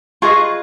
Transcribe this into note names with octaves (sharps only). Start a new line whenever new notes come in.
F4 G#4 B4 D#5 C#6